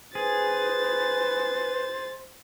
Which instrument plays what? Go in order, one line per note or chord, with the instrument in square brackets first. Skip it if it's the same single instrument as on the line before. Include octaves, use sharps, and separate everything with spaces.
[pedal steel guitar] G#4 [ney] B4 [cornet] C5 [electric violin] A6